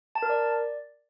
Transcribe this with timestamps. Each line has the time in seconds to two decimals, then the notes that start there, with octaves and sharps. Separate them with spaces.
0.15 A5
0.22 A#4
0.29 D5